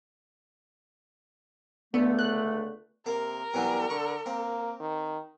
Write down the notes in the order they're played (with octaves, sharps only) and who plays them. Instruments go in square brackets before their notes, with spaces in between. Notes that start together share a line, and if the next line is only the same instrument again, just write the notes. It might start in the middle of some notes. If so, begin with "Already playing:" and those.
[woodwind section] C#2 D3 A3 [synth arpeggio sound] B3
[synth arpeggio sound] F#6
[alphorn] C3 [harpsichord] A#3 [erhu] A#4
[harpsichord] B2 E3 F#3 [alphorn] G3
[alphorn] D3 [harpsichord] C#6
[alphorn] A#3 [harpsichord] C4
[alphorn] D#3